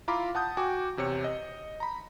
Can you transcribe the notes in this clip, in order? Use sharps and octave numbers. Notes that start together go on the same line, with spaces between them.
E4 F4 F5 A#5 B5 D6
F#5 A5 D#6 G6
F#4 G5 G#5 D6
E2 C3 C#5 C#7
D#5
A#5 B5